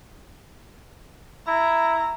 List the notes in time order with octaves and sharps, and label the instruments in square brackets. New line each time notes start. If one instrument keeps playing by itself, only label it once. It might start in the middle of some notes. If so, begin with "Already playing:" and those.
[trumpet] E4 [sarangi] A#5